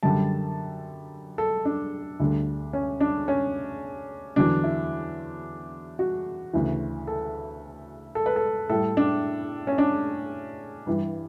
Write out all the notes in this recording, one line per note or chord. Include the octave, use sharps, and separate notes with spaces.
F#2 D3 G3 A5
A4
D4
D2 D3 G3
C#4
D4
C#4
E2 D3 F#3 D4
E4
F#4
D2 C#3 E3
A4
A4
B4
A4
A2 G3 A4
D4
C#4
D4
G2 E3 G3